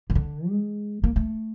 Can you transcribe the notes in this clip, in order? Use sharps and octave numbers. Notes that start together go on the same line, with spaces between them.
D#3
D3
G#3
A#3
A3